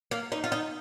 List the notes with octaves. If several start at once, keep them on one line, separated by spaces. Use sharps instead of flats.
A#3
D#4
F4
D#4